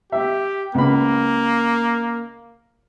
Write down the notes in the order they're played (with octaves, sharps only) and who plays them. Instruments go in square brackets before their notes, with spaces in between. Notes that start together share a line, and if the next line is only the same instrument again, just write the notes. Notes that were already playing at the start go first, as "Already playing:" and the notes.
[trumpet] G4 [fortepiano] E5
[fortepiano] C#2 B3 B5 [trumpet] A#3